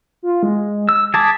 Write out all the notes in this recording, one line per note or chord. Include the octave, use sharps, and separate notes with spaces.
F4
G#3
E6
G#4 A5 D6 B6